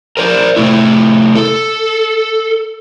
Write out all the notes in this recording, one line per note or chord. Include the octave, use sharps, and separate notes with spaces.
A#4 C5 D5
C3 A3 E4
A4